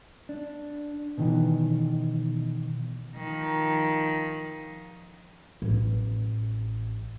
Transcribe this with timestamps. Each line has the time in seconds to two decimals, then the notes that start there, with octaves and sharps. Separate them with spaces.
0.29 D4
1.18 B2 D#3 E3
3.15 D#3 F3
5.62 A1